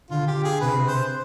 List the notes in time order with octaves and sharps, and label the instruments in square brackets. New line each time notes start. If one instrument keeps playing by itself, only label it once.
[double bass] D3 [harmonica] F4
[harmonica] G4
G#4
[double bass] C3 [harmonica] B4
[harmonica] C5